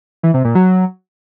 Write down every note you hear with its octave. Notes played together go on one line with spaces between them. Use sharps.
E3
C3
A#2
F#3